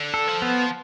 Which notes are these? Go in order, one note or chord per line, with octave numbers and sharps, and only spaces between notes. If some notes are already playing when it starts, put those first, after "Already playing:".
Already playing: D3
A4
F3
B3